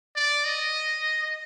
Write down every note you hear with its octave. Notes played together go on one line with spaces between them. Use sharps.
D5
D#5